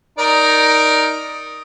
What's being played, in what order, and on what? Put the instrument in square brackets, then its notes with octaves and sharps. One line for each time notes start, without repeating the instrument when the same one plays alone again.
[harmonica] D#4 A#4 D5